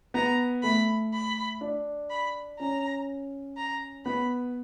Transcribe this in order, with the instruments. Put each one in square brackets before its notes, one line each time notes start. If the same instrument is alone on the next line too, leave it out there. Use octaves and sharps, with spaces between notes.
[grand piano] B3 [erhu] A#5
[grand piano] A3 [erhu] B5
[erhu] B5
[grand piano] D4
[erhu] B5
[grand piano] C#4 [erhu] A#5
[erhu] A#5
[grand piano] B3 [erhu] B5